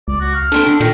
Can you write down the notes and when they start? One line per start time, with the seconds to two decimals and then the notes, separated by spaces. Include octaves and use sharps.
0.08 C#2 D5
0.21 F#4
0.34 F5
0.52 A3 C4 D4 A#4
0.66 D3 D4
0.80 A#2 D#3 A3 A#4